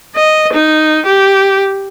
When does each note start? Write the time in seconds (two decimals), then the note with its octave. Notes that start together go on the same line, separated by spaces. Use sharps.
0.16 D#5
0.53 D#4
1.06 G4